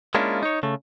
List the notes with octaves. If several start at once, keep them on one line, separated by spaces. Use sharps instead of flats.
G#3 A#3 C#4 D4 E4 F4
D#4 C#5
C#3 A3